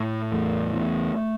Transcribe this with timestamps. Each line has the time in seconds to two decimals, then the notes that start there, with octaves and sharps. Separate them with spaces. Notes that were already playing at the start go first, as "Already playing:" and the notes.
Already playing: A2
0.32 E2 A3
0.73 E2